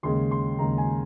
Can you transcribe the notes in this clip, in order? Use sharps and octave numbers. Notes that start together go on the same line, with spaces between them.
D#2 C#3 G#3 C6
C6
D#2 C#3 G#3 A#5
G#5